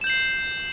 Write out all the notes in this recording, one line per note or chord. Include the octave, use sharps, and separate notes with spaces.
G6 C7 E7 F#7